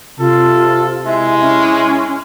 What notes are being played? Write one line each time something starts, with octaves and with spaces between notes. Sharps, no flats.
C3 F4 A4
G#3 E4 E5
C#4